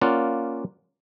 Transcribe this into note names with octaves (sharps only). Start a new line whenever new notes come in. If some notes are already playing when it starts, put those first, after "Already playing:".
A#3 C#4 F4 D5 F#5